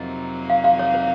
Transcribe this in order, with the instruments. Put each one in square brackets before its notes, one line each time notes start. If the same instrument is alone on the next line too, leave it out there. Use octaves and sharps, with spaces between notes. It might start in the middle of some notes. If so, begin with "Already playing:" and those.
Already playing: [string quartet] F2 C3 F#3 A#3 D#4 [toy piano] D#5
[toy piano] F5
F5
C#5
C5